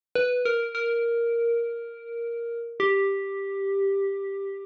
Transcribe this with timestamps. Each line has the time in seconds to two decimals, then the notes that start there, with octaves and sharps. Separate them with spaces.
0.15 B4
0.45 A#4
0.75 A#4
2.80 G4